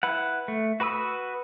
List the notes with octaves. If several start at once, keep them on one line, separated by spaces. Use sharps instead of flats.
E4 B4 F#5
A3
F#4 B4 B5 D#6 E6